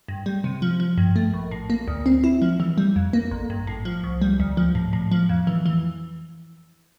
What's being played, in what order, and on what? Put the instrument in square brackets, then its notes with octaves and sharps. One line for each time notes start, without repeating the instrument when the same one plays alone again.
[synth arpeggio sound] G2
G3
C3
F3
F3
G2
A3
A#1
A2
A#3
D2
C4
E4
F3
E3
G3
F2
A#3
A1
G2
A2
F3
C2
G3
D2
F3
A2
A2
F3
F2
E3
E3